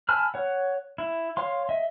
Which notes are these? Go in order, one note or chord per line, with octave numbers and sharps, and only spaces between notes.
G#5 A5 B5 E6 F6
C#5 F#5
E4
C#5 F5 C6
D#5 E5